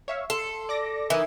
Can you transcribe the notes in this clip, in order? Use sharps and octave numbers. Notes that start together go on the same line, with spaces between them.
C#5 E5 F5
A4 C6
D5 D6 A#6
E3 D#4 A#4 D#6